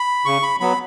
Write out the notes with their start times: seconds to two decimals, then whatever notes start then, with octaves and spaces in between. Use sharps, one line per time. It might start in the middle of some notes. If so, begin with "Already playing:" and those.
Already playing: B5
0.25 C#3 C#6
0.42 B5
0.60 F#3 B3 B5